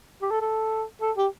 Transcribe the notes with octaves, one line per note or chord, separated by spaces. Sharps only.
G4
A4
A4
A4
G4